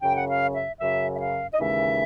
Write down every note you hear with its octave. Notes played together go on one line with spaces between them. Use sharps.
F#2 C#3 F#3 G5
F#5
F5
E5
F#2 C#3 F#3 E5
E5
F5
D#5
D#2 C#3 E3 G#3 E5